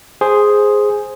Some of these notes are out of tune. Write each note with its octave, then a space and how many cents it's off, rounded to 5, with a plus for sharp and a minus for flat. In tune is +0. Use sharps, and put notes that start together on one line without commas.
G#4 +0 C5 +0